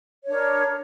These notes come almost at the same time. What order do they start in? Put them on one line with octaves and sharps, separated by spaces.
C#5 D4 A#4